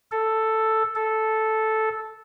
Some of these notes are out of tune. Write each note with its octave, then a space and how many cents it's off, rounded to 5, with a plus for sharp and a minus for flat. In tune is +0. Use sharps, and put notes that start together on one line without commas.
A4 +5
A4 -5